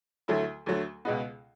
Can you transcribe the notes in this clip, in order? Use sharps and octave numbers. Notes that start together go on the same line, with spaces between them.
D2 D3 F#3 A3 E4
D2 D3 F#3 A3
C#2 B2 G#3 B3